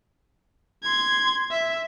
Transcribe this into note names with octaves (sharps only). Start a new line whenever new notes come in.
C6 G#6
E5